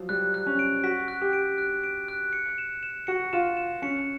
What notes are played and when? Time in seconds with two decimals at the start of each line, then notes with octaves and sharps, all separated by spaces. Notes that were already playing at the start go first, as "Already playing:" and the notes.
Already playing: F3 F#3
0.09 G3 F#6
0.34 F#6
0.46 C#4
0.59 D7
0.84 F#4 B6
1.08 F#6
1.21 G4
1.33 D7
1.58 F#6
1.83 D7
2.08 F#6
2.33 C#7
2.58 E7
2.83 E7
3.07 F#4 C#7
3.33 F4 E7
3.57 E7
3.82 C#4 C#7